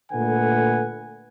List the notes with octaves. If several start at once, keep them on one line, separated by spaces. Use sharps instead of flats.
A#2 D3 A3 B4 F#5 G#5